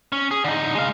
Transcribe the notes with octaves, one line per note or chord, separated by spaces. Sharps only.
C#4
G#4
D3 D#4
G#3 F5